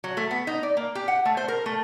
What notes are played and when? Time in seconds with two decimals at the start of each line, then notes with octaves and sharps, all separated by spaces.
0.04 F#3
0.17 A3
0.31 B3
0.47 D#4
0.63 D5
0.77 A#3
0.95 G4
1.08 F#5
1.25 A3
1.37 C5
1.48 A#4
1.66 A3